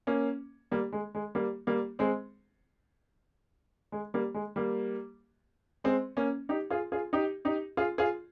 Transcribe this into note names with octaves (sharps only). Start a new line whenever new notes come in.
A#3 C#4
G3 A#3
G#3
G#3
G3 A#3
G3 A#3
G#3 C4
G#3
G3 A#3
G#3
G3 A#3
G#3 C4
A#3 C#4
D#4 G4
F4 G#4
F4 G#4
D#4 G4
D#4 G4
F4 G#4
F4 G#4